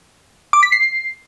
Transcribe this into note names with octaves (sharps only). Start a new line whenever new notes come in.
D6
B6
C7